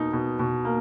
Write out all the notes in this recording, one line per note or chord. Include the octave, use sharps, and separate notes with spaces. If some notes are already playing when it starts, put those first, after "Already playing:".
Already playing: B2 A#3 D#4
B2
B2
A#3